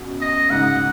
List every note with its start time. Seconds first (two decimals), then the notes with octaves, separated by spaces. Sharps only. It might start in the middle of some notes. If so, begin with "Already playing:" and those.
Already playing: F#2 B2
0.21 D#5
0.50 G#2 C#3 F#5